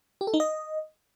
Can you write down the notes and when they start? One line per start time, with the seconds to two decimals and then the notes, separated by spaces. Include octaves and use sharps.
0.21 G4
0.27 A4
0.34 D#4
0.40 D#5